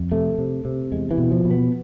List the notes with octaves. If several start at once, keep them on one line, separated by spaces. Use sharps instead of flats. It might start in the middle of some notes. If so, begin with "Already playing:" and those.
Already playing: F2
C3 A3
C3
C3
E2 G#3
E3
B2
F3
B2
B3